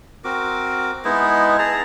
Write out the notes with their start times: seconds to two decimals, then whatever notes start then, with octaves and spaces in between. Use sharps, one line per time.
0.24 C4 F#4 A#4 D6
1.05 G#3 B3 D#4 E4
1.59 G#4 A5 A#5